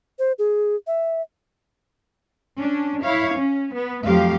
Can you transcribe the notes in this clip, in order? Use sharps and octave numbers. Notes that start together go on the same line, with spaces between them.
C5
G#4
E5
C#4 D4
E4 C#5 F5
C#4
B3
F2 F3 F#3 A3 G4 F5